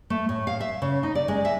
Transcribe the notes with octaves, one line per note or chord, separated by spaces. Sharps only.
A3
A2
F5
E5
C#3
D#4
D5
G#3
E5